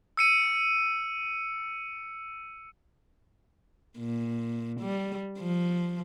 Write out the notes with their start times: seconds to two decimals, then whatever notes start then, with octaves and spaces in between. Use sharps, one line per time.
0.17 E6 C#7 D#7
3.98 A#2
4.80 G3
5.39 F3